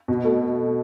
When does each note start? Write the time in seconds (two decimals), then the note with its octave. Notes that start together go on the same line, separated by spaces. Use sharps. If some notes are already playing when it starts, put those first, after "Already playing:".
0.08 B2
0.24 A3